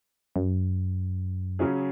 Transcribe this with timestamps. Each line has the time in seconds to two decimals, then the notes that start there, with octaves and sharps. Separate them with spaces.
0.36 F#2
1.59 C#3 F#3 C#4 G#4